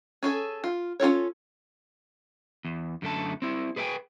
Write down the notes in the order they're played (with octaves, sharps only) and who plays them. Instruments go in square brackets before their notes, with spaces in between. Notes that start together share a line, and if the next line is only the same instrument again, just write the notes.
[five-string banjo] C#4 G#4 A4
F4
C#4 F4 A4 C#5
[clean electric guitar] E2
F#2 D3 A3 A5
C4 E4
G#4 B4 D5 E5 G5 G#5